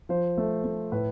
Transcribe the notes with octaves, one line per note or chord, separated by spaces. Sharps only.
F3 C5
A3
A3
A2 B4